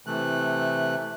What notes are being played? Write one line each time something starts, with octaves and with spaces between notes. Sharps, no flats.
C3 E3 A3 F#6